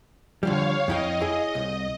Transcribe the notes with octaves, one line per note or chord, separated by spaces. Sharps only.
D3 F3 G3 C#5 F5
F2 E4 D#5 G5
E4 G#4
C2